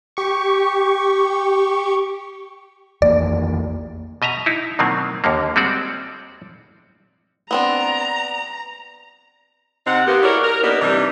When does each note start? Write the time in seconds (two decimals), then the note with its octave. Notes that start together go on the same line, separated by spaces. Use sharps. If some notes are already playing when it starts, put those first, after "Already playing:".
0.17 G4 C#6
3.02 F2 E3 A#3 D5
4.22 B2 D#5 E5 A#5
4.46 D#4 E4
4.79 B2 D#3 F#3 A#3 C4
5.24 D#2 D3 A#3
5.56 G3 G#3 C4 F#4 D5
7.51 B3 C4 D4 A#5
9.87 C3 C4 D#4 F#5
10.07 A#3 B3 G4
10.23 E4 F#4 G#4 A#4 C#5 D5
10.44 A#4
10.64 A#3 B3 D4 D#4 G4 B4
10.81 C3 E3 G3 D4 D#4